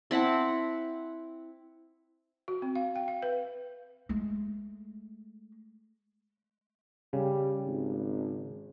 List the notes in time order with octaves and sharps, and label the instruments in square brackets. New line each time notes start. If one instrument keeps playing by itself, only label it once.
[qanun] C4 E4 F#5 A5
[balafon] F#4
C4
F5
G5
F5
B4
[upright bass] G#3 A3
[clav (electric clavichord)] C#3 [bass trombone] G3
[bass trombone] G#1